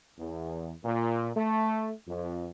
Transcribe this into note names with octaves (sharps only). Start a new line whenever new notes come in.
E2
A#2
A3
F2